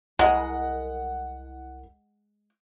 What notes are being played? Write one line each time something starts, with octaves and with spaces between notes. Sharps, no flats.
C2 G#3 A#4 D#5 F#5